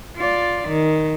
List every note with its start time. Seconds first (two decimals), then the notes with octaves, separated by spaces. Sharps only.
0.16 F4 D5
0.68 D#3